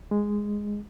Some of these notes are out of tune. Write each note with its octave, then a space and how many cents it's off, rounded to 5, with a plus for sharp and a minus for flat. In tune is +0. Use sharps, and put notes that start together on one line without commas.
G#3 -5